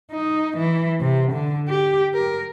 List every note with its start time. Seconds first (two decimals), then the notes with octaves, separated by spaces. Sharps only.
0.12 D#4
0.58 E3
1.01 C3
1.33 D3
1.69 G4
2.14 A#4